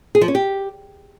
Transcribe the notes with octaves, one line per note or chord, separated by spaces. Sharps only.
G#4
F3
C#4
G4